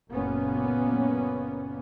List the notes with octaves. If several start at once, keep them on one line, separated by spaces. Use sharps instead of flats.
F#1 A#2 A#3 B3 C#4